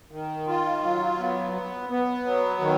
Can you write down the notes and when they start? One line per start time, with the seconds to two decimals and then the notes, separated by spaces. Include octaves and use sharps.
0.11 D#3
0.47 F4
0.82 F#3
1.18 B3
1.54 B3
1.89 B3
2.25 F#3
2.61 D#3